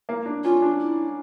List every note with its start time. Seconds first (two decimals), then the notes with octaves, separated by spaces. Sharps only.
0.09 A#3
0.26 D4
0.44 C#4 F4
0.62 D4
0.80 E4